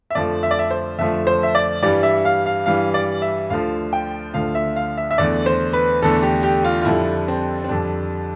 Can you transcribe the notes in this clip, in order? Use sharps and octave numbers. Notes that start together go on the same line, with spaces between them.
E5
F2 D3 F3 A3 D5
E5
D5
E5
C5
F2 D3 F3 A3 E5
C5
E5
D5
G2 E3 G3 D5
E5
F5
F5
G2 E3 G3 F5
D5
E5
D2 D3 F3 F5
G5
D2 D3 F3 F5
E5
F5
E5
E5
E2 D3 A3 D5
C5
B4
E2 D3 A3 A4
G4
G4
F4
F4
F2 D3 G3 E4
C4
C4
F2 D3 G3 D4